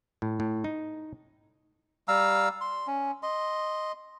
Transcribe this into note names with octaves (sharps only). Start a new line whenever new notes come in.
A2
A2
D#4
G3 F5 A#5 E6
C6
C#4
D#5 C6